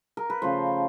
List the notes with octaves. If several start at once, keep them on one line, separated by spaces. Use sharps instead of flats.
A#4
B4
C#3 F3 A3 C5